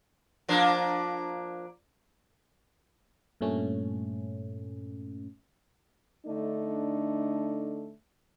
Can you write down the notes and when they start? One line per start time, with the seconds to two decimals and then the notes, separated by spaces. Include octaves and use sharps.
0.48 F3 A#3 D4
3.41 G2 A#2 A3 C#4
6.26 D3 A3 D4 D#4